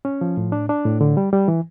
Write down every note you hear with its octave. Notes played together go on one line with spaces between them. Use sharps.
C#4
F3
A2
D4
D4
A2
D3
G3
G3
E3